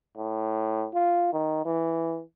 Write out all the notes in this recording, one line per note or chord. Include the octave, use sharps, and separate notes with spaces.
A2
F4
D#3
E3